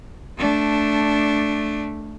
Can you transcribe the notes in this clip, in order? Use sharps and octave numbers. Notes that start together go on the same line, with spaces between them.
A3 D4